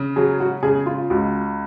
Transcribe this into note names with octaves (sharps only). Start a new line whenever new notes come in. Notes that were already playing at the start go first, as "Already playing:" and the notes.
Already playing: C#3
F#3 G#4
F#4
C#3 G#4
F4
C#2 F#4